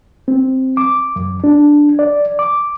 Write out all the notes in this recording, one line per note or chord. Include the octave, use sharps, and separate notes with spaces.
C4
D6
F#2
D4
D5
D6